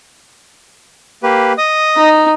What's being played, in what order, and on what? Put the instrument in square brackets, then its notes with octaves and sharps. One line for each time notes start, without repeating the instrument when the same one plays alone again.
[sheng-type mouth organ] A#3 G4 B4
D#5 D#6
[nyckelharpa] D#4